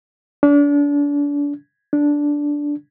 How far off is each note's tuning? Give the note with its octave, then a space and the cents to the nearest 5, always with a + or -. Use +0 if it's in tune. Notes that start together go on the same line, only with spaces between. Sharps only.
D4 -35
D4 -10